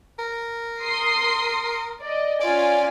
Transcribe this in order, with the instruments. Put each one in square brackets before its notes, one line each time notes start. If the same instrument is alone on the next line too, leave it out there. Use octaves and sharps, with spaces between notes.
[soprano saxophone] A#4
[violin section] C6 D#6 C7
D5 D#5
[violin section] C#4 F4 G#5 [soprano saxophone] D5